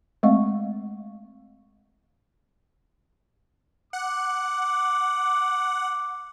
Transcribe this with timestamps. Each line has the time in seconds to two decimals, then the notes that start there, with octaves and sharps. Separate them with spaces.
0.23 G#3 A3 C4 D#5 F5 C#6
3.93 F#5 D6